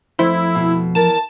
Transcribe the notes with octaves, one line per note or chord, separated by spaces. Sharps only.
F2 A3 E4 C5
B2
E3 A#4 A5